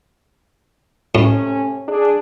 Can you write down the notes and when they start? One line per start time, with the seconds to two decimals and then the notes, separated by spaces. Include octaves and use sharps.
1.15 A2 C3 A3 C#4
1.87 D4 G#4